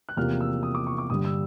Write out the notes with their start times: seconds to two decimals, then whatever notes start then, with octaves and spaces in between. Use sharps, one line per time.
0.09 F#6
0.17 E2 C3 F3 A#3 F6
0.41 E6
0.63 D#6
0.75 D6
0.87 C#6
0.98 D6
1.10 G2 D3 G3 D#6
1.25 E6